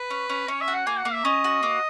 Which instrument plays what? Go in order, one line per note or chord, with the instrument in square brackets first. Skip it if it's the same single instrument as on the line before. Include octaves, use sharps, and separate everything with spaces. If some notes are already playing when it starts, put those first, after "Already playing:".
Already playing: [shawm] B4
[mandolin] C#4
C#4
[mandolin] C#4 [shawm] C#5
[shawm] E5
[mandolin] F#4
[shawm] F#5
[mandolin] A#3 [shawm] G#5
[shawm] F#5
[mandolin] A#3
[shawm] E5
[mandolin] C#4 [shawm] D#5
[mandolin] F#4
A#3